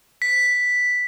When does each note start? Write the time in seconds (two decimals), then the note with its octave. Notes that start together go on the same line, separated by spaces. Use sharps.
0.22 B6